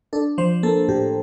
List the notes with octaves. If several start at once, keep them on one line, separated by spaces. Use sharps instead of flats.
D4 A4
F3 C5
A#3 A4
A2 G4